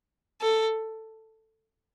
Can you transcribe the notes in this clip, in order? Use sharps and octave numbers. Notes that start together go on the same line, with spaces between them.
A4